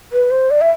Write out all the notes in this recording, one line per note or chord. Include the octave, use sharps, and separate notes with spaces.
B4
C5
D5
E5